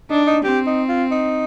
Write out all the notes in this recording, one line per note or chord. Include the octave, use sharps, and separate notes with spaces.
D4 D#4
D#4
C4 G4
D#4
F4
D#4